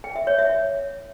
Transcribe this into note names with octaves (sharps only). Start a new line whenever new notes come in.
G5
E5
C#5
E5